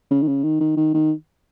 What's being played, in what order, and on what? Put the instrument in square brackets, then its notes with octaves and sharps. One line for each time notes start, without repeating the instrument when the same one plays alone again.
[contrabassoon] C#3
D#3
C#3
D#3
D#3
D#3
D#3